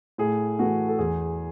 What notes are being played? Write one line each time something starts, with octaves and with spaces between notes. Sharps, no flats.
A2 G#4
E3 A3 F#4
A4
E2 G#4